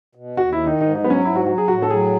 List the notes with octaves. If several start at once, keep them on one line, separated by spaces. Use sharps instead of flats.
B2
D#2 F#4
E4
D#3
D#4
G#2 D#4
D#4
F#3 B3
C#4
G#2 E4
F#4
F#3 F#4
G#4
A2 F#4
A4
F#3 G#4